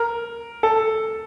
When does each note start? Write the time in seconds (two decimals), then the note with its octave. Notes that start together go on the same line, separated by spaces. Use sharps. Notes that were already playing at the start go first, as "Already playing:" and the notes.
Already playing: A#4
0.63 A4